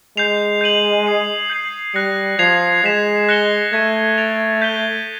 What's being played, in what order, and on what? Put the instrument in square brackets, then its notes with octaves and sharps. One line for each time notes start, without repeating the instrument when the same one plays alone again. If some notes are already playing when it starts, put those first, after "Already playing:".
[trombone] G#3 [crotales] G6 C7 F7
[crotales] G6 C7 D#7 F#7
D#6 G#6 C7 D#7
G6 C7 D#7 F#7
[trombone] G3 [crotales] F#6 A#6 C#7
[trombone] F3 [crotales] G#6 C7 F7
[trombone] G#3 [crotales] G#6 B6 E7
[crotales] F#6 A#6 C#7 E7 G7
[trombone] A3 [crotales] G#6 B6 D#7
[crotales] A6 D7 F7
G6 B6 D#7 G7